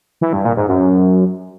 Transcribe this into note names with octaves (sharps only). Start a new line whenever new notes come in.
E3
G2
A#2
G#2
F#2